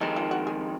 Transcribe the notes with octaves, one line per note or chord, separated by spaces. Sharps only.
F2 D#3 G#3 C4 D#4
F4
F#4
G#4